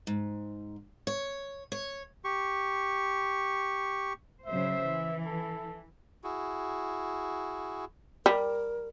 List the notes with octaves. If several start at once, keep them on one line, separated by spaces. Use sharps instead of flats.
G#2
C#5
C#5
G4 C#6
C#3 F#3 C5 E5
E3
A4
E4 F#4 G#4
G3 A#4